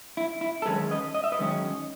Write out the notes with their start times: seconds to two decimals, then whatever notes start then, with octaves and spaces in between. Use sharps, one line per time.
0.17 E4
0.41 E4
0.62 A4
0.65 F#2 D#3 G#3 C#4 G#4 B4
0.91 B4 D#5
1.14 D#5
1.24 E5
1.32 B4 D#5
1.39 F#2 D#3 G#3 C#4